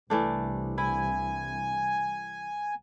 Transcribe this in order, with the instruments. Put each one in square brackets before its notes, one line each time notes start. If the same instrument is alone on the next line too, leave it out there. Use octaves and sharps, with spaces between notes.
[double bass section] C2 [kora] E3 A3 D4
[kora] E4 [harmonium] G#5